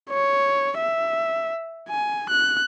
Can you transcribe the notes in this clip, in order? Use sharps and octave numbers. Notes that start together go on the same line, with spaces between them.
C#5
E5
G#5
F#6